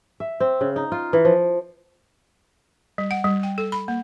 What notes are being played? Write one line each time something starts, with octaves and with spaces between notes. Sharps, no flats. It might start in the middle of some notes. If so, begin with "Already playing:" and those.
E5
C4
C#3
D#4
F4
E3
F3
G3
F#5
G3
G5
A4
B5
A#3